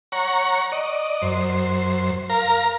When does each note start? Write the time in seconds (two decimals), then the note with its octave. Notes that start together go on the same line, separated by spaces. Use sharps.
0.12 C#5 F#5 A#5 C#6
0.72 D5 D#5
1.22 F#2 C5
2.30 A#4 F5 A#5